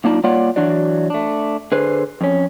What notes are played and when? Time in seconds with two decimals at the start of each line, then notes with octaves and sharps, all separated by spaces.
0.04 F#2 A#3 D4 D#4 F4
0.23 G3 A#3 F4 C#5 D5 F#5
0.56 E3 F#3 D4 F#4 D5
1.10 A3 D4
1.72 D3 G#4 B4 C5
2.21 F2 C#4